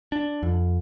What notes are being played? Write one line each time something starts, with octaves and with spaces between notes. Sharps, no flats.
D4
F2